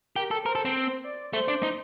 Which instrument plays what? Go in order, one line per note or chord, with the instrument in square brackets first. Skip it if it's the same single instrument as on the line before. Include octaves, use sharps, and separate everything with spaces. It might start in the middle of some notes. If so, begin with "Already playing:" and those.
[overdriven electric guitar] G4 [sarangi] A#4
[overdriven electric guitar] A4
[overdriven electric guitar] A#4 [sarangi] C5
[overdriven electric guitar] A4
C4
[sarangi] D5
[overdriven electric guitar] A3 [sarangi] C5
[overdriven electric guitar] D4
D#4